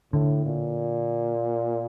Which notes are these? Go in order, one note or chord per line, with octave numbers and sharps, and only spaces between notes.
A2 D3
A#2